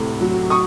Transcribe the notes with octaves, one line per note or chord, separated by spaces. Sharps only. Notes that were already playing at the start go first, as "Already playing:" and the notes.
Already playing: D2 A2 C3
F#3
C#6 D#6